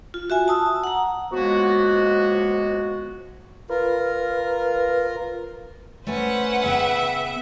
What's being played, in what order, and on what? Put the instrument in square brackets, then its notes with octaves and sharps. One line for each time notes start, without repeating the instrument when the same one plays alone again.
[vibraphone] F4
F#4 E5 G#5
A5 D#6 E6
F#5 A#5
[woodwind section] C#2 F3 G#3 A#3 B3 F#4
[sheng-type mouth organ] F4 A#4 [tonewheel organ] B4
[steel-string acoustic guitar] A3 G#5 [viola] C#4 C5 [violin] B4 F#5
[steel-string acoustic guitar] C#3 B3 G5 [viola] E5